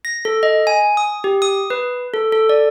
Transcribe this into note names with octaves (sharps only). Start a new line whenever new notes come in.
A#6
A4
D#5
G#5
D#6
G4
D#6
B4
A4
A4
D5